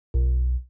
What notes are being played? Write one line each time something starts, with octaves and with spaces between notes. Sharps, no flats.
B1